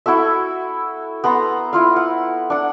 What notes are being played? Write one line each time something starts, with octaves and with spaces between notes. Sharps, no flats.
E4 F#4 A4 E5
B3 A4 A#5 C6
E4 F4 F5
F#5
D4 F#5